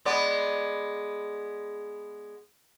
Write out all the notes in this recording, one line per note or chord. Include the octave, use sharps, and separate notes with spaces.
G#3 B3 D5